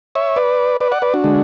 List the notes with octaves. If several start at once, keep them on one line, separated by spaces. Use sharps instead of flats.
C#5 E5
B4 D5
B4 D5
D5 F#5
B4 D5
D4 F#4
D3 G#3